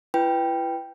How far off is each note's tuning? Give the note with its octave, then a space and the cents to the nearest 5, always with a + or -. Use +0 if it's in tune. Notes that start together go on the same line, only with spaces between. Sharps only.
E4 +40 B4 +0 G5 +0